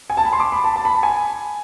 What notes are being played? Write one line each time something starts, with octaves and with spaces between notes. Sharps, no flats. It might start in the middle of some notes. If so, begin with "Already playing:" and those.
G#5
A5
B5
C6
D6
B5
A5
A5
B5
A5
G#5